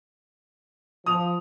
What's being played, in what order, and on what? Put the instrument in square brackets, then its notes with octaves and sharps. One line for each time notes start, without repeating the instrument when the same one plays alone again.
[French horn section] F3 [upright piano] D#6 F7